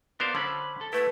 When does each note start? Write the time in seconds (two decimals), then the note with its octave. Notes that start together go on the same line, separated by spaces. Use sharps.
0.20 B3 F4 A#4 C5 D5
0.35 D3 C#4 C5 B5
0.81 A4
0.93 A3 E4 B4